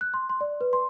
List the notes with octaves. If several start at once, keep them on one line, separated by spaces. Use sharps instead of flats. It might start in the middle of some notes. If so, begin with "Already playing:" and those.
F#6
C6
C6
D5
B4
C6